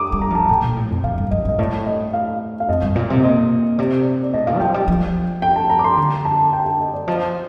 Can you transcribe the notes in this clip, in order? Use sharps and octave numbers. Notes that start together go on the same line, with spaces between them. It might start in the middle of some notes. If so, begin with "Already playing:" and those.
Already playing: D6 D#6
G3
A#5
F3 A5
A2 G5
A#2
A2
F2
F2 F5
G2
F2 D#5
G2 D#5
A2 D5
D#5
F5
F5
F2 D#5
G2
A#2
C3
A#2 D#5
C3 D5
D5
D5
A2 D#5
A#2 F5
G3
F3 G5
G3 G5
F3
G5
A5
A#5
D6
C6
D3 A#5
A5
G5
A5
G5
D#5
D5
F3 D#5